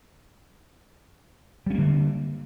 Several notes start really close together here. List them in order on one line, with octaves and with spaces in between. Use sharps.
G3 C#4 A#3 D3